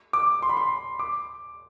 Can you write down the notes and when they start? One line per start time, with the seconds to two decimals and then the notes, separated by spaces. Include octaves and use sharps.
0.13 D6
0.42 C6
0.49 B5
0.57 C6
0.99 D6